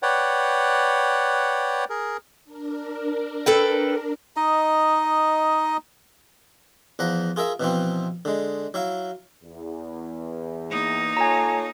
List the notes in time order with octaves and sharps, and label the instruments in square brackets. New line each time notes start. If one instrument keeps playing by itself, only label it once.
[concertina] B4 C#5 D5 F#5 G5
G#4 A#4
[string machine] D4 A#4
[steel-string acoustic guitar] A4 B4 G5
[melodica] D#4 D#5
[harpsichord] E2 F3 F#5 A#5 B5
F4 G#4 A#4 E5
B2 E3 F3 C4
D3 G#3
F#3 E4 F5
[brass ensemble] E2
[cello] A#3 D#4
[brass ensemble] F4 A4 C#5 [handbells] G#5 A#5